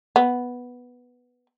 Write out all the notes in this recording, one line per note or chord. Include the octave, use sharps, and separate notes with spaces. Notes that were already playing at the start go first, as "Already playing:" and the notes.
B3